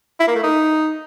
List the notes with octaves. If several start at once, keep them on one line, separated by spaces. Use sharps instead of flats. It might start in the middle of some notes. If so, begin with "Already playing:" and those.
E4
A#3
A3
D#4